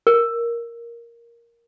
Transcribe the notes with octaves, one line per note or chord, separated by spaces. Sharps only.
A#4